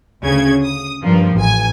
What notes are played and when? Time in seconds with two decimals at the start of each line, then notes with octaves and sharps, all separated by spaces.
0.24 D2 C#3 G#6
0.63 D#6
1.03 G2 F3 A#3
1.34 A1 G#5